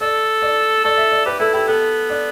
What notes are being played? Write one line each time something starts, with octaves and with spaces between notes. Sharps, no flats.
A4 D5
D5
A4 D5
E5
D5
G4 B4
E4 A4
E4 G4
B3 A4
D4